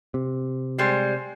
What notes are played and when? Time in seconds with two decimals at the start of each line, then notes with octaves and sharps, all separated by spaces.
0.14 C3
0.78 G3 G#3 C5